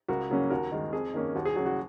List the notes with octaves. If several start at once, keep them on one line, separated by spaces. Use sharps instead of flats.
C#2 F#4 A#4
C#3 F#3 A#3 C#4
D#2 F#4 A#4
D#3 G#3
F2 G#4
D#3 A#3 C#4
D#2 F#4
G#4
C#3 F#3 F#4
F#4